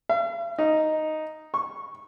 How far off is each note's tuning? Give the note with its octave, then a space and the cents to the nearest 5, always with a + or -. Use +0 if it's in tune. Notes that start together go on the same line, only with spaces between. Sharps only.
F5 -45
D#4 +0
C#6 -20